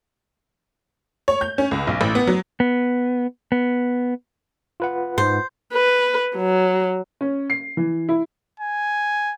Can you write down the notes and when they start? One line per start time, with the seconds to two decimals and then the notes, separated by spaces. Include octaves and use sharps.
1.28 C#5
1.41 G6
1.58 C#4
1.71 C#2
1.87 B1
2.01 A1
2.15 B3
2.27 F#3
2.60 B3
3.52 B3
4.80 F4 B4 F#5
5.18 G#2 C5
5.73 B4
6.36 F#3
7.21 C#4
7.50 C7
7.77 E3
8.09 E4
8.60 G#5